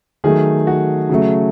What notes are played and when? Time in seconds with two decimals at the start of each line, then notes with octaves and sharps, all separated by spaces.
0.24 D#3 F#3 A3 G#4
0.67 F#4
1.09 C#3 F#3 A3